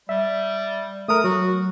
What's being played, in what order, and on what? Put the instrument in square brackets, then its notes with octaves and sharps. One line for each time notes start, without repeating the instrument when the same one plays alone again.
[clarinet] G3 [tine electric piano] E5
[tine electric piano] A3 A#4 [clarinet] D#6
[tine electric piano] F#3 [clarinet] F#4